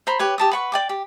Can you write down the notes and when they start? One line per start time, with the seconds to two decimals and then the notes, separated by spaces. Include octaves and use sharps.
0.07 C5 A#5 B5
0.19 G4 B4 C#5
0.38 G4 A5 D#6
0.52 B4 F#5 C#6
0.72 D5 G5 D6
0.89 G4